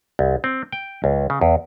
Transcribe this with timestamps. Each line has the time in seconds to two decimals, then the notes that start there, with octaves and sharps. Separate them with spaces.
0.19 C2
0.44 C4
0.72 G5
1.04 C#2
1.30 C#3
1.41 E2